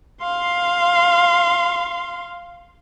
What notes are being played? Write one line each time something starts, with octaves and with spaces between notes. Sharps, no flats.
F5 C6